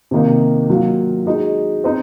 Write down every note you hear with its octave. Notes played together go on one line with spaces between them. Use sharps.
C3 D#3 A#3 D#4
F#3 A#3 F4
G#3 D#4 F#4
C4 D#4